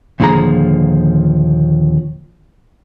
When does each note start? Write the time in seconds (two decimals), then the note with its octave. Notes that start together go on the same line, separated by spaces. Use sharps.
0.20 D#2 A#2 D3 F3 G#4 A#5